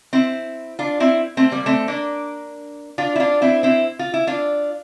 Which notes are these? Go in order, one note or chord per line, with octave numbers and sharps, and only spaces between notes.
C4 E4
D4 F4
C4 E4
A3 C4
G3 A#3
A3 C4
A#3 D4
D4 F4
E4
D4 F4
C4 E4
C4 E4
F4
E4
D4 F4